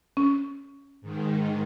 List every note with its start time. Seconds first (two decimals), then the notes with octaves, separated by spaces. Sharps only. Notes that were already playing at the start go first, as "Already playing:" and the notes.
0.17 C#4
1.01 G#2 D#3